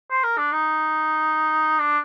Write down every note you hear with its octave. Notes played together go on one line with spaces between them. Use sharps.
C5
A#4
D4
D#4
D4